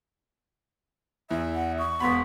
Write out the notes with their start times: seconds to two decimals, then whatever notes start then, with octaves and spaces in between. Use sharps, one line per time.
1.31 E2 E5
1.55 F#5
1.79 C#6 D#6
2.00 E1 B3 F#5 B5 C6 B6